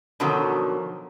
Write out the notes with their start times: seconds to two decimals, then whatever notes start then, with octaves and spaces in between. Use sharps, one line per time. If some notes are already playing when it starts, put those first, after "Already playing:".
0.20 B2 D3 D#3 F3 F#3